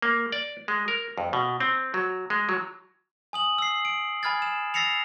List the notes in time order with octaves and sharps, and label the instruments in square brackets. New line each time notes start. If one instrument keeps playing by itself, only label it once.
[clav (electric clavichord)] A#3
D5
G#3
A#4
F2
B2
C4
F#3
G#3
F#3
[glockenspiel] G#5 D#6 F#7
E6 C7
D7
G#5 B5 F6 G#6 A6
E7
E6 A6 A#6 C7 C#7 F7